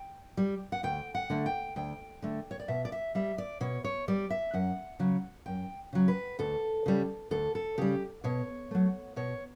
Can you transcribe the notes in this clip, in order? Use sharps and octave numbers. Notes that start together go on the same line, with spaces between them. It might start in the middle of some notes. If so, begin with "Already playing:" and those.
Already playing: G5
G3
F#5
D2 G5
F#5
D3 A3
G5
D2 G5
D3 A3
C#5
D5
B2 E5
D5
E5
G3 E5
D5
B2 C#5
C#5
G3 D5
E5
F#2 F#5
C#3 F#3
F#2 G5
C#3 F#3
B4
D2 A4
C#3 G3
D2 A4
A4
C#3 G3 G4
B2 C#5
F#3 A3
B2 C#5